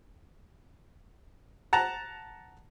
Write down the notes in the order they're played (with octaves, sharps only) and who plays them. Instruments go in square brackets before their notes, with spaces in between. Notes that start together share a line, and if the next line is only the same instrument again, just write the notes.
[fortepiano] F#5 A5 A#5